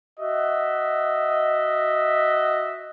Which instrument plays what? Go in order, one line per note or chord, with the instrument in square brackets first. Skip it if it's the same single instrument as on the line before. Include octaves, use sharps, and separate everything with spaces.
[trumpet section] F#4 D#5 E5